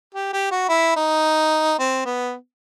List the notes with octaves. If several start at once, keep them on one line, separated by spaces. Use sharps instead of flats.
G4
G4
F#4
E4
D#4
C4
B3